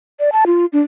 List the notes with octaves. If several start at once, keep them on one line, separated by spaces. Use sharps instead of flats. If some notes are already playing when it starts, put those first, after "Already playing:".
D5
A5
F4
D4